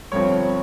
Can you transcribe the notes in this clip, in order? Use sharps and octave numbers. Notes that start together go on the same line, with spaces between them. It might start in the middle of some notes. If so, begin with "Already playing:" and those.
G1 G2 F3 C4 C#5